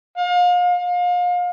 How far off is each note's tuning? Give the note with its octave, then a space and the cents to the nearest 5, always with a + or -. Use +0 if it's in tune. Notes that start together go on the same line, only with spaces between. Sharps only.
F5 +35
F5 +35